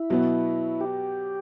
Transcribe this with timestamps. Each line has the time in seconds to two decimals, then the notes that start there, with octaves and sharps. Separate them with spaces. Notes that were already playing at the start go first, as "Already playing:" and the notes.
Already playing: E4
0.10 B2 F#3 B3
0.81 G4